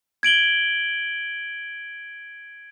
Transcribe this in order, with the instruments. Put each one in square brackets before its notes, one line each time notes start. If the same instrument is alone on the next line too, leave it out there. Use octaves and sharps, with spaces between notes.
[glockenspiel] G#6 D7 F#7 G7